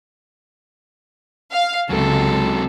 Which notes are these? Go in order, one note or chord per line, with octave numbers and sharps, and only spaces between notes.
F5
C#2 C3 F#3 A4